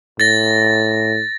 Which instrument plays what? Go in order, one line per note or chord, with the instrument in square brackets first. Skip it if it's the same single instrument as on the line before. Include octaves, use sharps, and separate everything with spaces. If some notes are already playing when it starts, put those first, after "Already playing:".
[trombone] A2 [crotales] A6 A#6